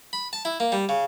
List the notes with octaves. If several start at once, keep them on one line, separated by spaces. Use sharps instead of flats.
B5
A5
E4
A#3
G3
C#3